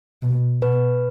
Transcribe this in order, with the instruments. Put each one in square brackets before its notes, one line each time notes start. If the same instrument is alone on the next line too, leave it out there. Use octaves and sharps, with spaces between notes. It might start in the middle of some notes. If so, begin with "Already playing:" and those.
[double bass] B2
[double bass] B2 [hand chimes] B4